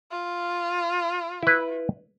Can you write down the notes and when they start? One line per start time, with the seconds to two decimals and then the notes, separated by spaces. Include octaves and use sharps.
0.12 F4
1.43 E4 B4